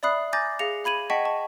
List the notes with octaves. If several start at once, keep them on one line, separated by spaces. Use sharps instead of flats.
D5 E5 B5 D#6 F#6 C7
G#5 A#5 D6 G6 A6 A#6
G#4 F5 A#6 C#7 F7
F5 B5 G#6 D#7 F#7
D#5 F#5 G5 A5 C#6 B6
A5 C#6